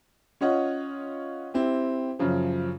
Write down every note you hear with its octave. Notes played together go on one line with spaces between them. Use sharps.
C#4 F4 C#5 D#5 F#5
C4 E4 G4
F#2 C#3 F3